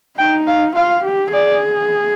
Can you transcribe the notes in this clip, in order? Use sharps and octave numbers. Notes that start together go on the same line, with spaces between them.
D#4 G5
F5
F4 F5
G4
G#4 D5